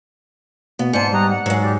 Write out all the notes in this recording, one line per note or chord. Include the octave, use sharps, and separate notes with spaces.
B2 B3
G#2 D5 G#5 A5 C6 C#7
G3 A#5 D#6 F#6
F#5
G#2 F#3 G#3
G4 D5